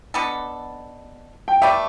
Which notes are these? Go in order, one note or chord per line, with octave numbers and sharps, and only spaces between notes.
B2 B3 D4 A4
G5
A3 G4 B4 D5 E5